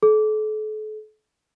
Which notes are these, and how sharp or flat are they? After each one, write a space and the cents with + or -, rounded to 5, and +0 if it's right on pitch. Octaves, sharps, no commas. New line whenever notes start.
A4 -40